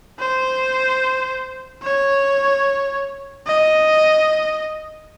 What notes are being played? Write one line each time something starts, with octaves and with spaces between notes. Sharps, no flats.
C5
C#5
D#5